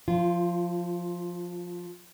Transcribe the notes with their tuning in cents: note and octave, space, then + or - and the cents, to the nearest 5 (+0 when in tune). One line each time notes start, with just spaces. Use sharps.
F3 +10 F4 -20